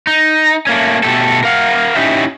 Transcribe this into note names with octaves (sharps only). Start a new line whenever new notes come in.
D#4
A3 A#3 C#4
B2 A3 G4 A4
A#4 F5 F#5
C#4 D#4 E4 G4 E5